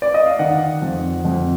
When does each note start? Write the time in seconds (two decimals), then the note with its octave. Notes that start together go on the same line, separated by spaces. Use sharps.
0.02 D5
0.14 D#5
0.26 F5
0.39 D#3 F#5
0.82 F2
1.25 F2